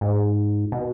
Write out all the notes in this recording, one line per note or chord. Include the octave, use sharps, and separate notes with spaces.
G#2
B2